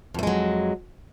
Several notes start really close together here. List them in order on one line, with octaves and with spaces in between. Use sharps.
F2 A3 G#3 F#3